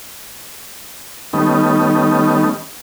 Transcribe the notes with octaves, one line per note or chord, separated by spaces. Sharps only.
D#3 G3 A3 B3 C#4 D#4